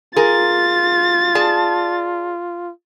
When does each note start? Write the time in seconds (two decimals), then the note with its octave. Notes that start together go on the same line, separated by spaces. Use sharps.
0.16 F4 G#4 A#4 A6
1.35 G#4 D5 A5